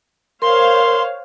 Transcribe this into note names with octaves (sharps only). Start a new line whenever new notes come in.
A#4 C5 C#5 F5 C6